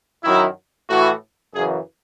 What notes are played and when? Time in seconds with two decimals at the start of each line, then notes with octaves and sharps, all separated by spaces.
0.24 F#2 D#3 F#3 E4
0.89 A2 E3 F#4
1.53 F#2 C#3 E3 G#4